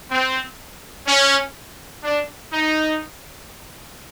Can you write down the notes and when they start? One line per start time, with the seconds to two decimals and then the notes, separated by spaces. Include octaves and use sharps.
0.11 C4
1.07 C#4
2.04 D4
2.53 D#4